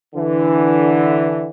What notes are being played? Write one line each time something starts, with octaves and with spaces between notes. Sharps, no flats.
D3 E3